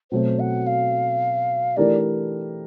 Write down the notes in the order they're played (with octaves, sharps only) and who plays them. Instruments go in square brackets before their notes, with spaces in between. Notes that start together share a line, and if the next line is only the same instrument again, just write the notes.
[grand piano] B2 F#3 A3 C4 [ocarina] C5
[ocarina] F#5
F5
[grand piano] E3 A3 D4 G4 A#4 [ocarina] D5